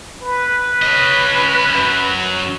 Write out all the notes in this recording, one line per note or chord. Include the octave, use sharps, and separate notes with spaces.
B4
C#4 D#5
F#2 F#3